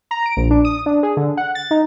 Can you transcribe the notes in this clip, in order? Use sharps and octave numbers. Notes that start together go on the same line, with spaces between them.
A#5
D7
A#1
D4
D#6
D4
G#4
D3
F#5
A6
D#4